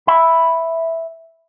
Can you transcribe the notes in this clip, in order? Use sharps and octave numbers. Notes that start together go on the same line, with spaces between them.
E5 B5